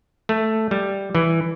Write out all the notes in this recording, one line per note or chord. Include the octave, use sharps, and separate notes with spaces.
A3
G3
E3